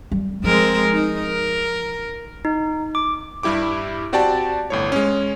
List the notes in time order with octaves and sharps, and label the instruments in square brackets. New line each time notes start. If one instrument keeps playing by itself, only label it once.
[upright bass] G3
[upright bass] F3 [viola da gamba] G#3 C4 A#4
[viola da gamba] D#4
A#4
[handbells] D#4
D6
[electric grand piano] G2 G3 E4 G4 D6
C4 F#4 G4 D5 G5 A5
G1 A2 C#5
G#3 C#4